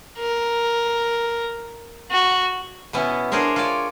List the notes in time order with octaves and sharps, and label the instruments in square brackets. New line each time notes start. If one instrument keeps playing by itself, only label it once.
[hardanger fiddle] A#4
F#4
[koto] B2 B3 C#4 E4
D4 G#4 A#4 C5 C#5
F4 C#5 D5